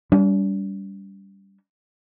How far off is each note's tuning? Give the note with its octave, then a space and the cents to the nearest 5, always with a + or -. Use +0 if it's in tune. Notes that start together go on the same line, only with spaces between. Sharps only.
G3 +0 D4 -45